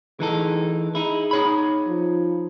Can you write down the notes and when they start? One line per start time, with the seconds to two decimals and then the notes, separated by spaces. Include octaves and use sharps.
0.20 E3 D#4 G#4 A4
0.95 D#4 E4 G#4
1.31 D#4 C#5 B5
1.88 F3